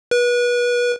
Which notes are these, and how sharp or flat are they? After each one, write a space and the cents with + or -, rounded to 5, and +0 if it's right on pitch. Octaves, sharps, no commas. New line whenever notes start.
B4 -30